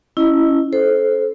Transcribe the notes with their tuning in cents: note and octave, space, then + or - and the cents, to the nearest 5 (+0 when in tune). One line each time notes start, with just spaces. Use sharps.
C#4 +0 E4 +0 D#5 +0
A4 -20 C5 +0